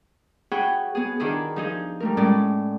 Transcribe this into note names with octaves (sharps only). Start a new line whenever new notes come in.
F#4 G#4 C#5 G5 B5 F#6
B3 G#4
D#3 D4 E4 G#4
F3 D#4 G#4
G3 A3 A#4
A2 G#3 C#4 E4 D5